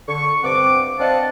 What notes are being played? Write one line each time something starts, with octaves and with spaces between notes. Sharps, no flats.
D3 C#6
G2 C3 C4 F#5 D6
C4 D4 D#5 F5 F#5 A5